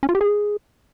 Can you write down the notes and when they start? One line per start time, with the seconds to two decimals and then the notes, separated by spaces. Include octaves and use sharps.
0.03 C#4
0.09 F4
0.15 G4
0.21 G#4